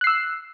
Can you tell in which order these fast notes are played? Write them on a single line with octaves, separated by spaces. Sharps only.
F#6 C7 E6